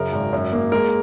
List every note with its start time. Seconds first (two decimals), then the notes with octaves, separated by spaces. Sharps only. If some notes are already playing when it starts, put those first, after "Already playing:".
Already playing: F#2 C#3 A#4
0.13 G#1
0.33 F#2
0.53 A#3
0.72 G#3 A#4